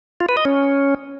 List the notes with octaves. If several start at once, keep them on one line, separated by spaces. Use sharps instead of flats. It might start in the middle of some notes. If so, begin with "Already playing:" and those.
F4
B4
D#5
C#4